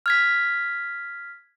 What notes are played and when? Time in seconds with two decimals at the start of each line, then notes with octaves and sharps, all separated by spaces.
0.06 F6 G#6 B6